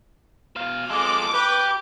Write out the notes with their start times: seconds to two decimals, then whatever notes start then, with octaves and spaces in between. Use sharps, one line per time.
0.56 B2 F5
0.89 G#3 F4 A4 D6
1.34 G4 B4